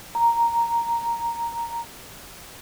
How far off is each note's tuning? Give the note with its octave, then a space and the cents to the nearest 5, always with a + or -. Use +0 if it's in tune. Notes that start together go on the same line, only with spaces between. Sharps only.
A#5 +0